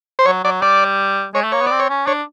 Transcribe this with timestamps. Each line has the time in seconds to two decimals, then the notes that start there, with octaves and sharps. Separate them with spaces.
0.19 C5
0.26 F#3 C#5
0.44 F#3 D5
0.62 G3 D5
1.35 G#3 C#5
1.44 A3
1.52 A#3 C#5
1.61 B3
1.66 C4 D5
1.80 C#5
1.89 C#4
2.07 D4 C#5